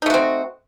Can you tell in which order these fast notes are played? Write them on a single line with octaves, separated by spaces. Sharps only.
D#4 A3 F#4 C4